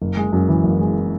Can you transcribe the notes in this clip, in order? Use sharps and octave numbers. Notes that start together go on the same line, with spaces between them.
F#1
G#3
F#2
E3
F#1
G#3